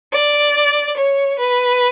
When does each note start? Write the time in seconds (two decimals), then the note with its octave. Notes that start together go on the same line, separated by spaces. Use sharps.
0.12 D5
0.97 C#5
1.39 B4